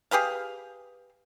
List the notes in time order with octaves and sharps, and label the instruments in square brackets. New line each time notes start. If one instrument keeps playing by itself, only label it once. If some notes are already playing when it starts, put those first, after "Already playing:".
[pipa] G4 G#4 B4 F5